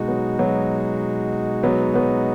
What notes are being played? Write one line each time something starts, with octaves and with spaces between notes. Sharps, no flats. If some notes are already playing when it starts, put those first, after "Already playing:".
Already playing: B2 G#3 D#4 F#4
F#3 B3
F#3 B3
F#3 B3
F#3 B3